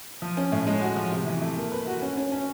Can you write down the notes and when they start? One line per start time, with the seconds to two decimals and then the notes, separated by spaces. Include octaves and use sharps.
0.22 F3
0.37 C#4
0.52 A2
0.67 G#3
0.82 F#4
0.96 F3
1.12 C3
1.26 E3
1.41 A3
1.57 A#3
1.72 B4
1.87 F#4
2.02 C#4
2.17 C#4
2.32 C#4